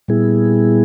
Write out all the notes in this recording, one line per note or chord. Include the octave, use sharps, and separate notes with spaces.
A#2 G3 B3 E4 G#4